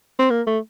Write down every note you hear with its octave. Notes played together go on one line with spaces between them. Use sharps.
C4
A#3
A3